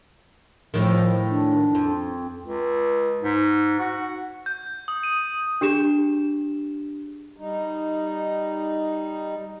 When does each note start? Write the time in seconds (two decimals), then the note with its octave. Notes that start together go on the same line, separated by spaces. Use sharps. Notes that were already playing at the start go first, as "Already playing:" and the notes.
0.74 A2 D#3 F3
1.30 D4
1.75 F2
2.44 C#2
3.23 G#2
3.80 F#4
4.46 G6
4.88 D#6
5.03 D#7
5.61 D4 G4 G#4 E7
7.37 G3 D#4